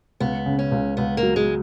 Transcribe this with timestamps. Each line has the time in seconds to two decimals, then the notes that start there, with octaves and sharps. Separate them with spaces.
0.20 C#2 B3
0.46 C#3
0.59 C#4
0.72 C#2
0.97 C#2 B3
1.17 A#3
1.23 F#3
1.36 G#3